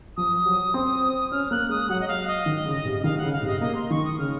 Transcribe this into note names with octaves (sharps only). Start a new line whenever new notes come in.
F3 D#6
F#3
C4
C#4 F6
A#3 F#6
G#3 D#6
F#3 F#5
D#5
F5
D#5
D#3
C#3
C3
D#5
D#3 F5
C#3 F#5
F5
C3
D#5
A#3 D#5
C6
D#3 C#6
D#6
C#3 F6